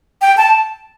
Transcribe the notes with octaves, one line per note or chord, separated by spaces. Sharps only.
G5
A5